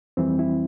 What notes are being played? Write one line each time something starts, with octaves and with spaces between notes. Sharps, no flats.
F2 E3 G3 C4
E4